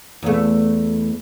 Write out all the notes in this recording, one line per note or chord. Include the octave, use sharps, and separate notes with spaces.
E2 A3